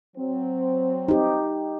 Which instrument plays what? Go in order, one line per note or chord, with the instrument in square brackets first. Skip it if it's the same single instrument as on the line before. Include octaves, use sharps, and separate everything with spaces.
[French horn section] F#3 C4
[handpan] D#4 G4